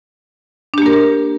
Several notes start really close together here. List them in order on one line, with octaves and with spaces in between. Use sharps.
D4 G4 A#3 A#4